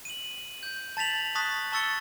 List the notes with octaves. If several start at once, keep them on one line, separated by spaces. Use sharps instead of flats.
D#7 F#7
G6
A5 A6 B6 F7 F#7
A5 C#6 D#6 F#6 A6 B6
A5 C#6 E6 A6 C#7 G7